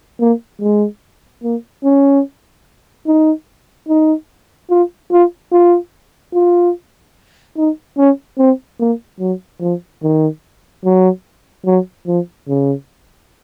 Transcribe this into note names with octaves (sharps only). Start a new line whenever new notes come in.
A#3
G#3
A#3
C#4
D#4
D#4
F4
F4
F4
F4
D#4
C#4
C4
A#3
F#3
F3
D#3
F#3
F#3
F3
C#3